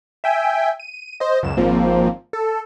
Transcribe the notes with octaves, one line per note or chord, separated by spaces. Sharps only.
E5 G5 G#5
D#7
C5 D#5
C#2 F#2 E7
G#1 G#2 F3 A#3 C4
A4